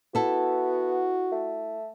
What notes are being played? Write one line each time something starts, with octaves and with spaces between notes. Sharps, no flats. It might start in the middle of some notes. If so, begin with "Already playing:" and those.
B3 E4 F#4 A4
A3